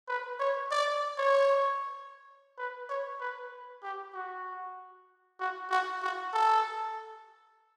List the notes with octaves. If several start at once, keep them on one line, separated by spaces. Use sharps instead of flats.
B4
C#5
D5
C#5
B4
C#5
B4
G4
F#4
F#4
F#4
F#4
A4